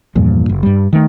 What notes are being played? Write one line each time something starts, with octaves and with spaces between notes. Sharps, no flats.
E2 G2 A#2 F3
F#1
G2 G3
D#3 A3